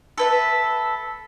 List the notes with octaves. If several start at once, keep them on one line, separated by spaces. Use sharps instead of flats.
A4 B4 E5